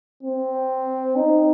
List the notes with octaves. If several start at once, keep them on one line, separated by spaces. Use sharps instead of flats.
C4
D#4